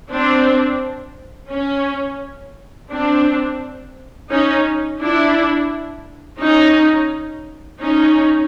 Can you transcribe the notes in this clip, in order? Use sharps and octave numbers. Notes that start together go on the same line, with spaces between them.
C4 D4
C#4
C4 D4
C#4 D#4
D4 E4
C#4 D#4
C#4 D#4